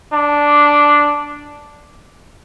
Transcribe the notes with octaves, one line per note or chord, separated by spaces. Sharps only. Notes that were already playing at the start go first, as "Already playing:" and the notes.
D4